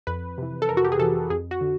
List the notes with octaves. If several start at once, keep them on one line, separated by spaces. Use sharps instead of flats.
F2 B4
C3 E3
A4
F2 A#4
F#4
G4
G#4
C3 E3 A4
F2 G#4
F#4
D3